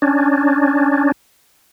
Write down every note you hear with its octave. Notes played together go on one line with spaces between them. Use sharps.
C#4 D4